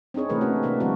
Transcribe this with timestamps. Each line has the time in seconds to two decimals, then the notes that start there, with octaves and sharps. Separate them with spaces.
0.14 C4 D4 D#4 G#4 C#5
0.29 C3 E3 A3 G#4 A#4 B4
0.41 A#3 C#4 F#4
0.63 C3 A#3 D4 E5
0.80 D3 F3 G3 C4 F#4 A#4